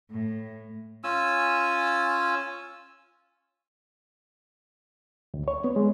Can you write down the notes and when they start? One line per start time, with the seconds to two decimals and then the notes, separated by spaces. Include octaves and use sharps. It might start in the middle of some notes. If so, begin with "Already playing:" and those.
0.11 A2
1.04 C#4 F4 G#5 E6
5.34 D2
5.48 C#5
5.64 B3
5.76 G#3